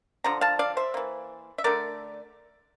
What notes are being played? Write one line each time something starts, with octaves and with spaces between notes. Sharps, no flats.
D3 F3 A#5
F5 A5
D5 F5
C5 E5
E3 A#3
E5
D3 A3 A#4 D5